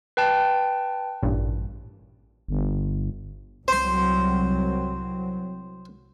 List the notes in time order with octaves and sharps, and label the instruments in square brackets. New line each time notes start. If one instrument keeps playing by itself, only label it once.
[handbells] B4 G5 A5
[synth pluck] A1 G2 A#2
[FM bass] G1
[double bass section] C2 F#3 C4 [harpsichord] C5 C6